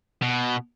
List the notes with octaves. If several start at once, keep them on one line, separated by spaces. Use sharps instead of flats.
B2